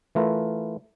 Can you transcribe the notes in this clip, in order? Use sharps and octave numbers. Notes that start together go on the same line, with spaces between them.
E3 A3 F4 A#4 B4